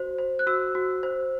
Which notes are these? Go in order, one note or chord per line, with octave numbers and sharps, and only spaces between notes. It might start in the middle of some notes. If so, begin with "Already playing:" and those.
Already playing: F#4 C5
C5
F#6
F#4 E6
F#4
C5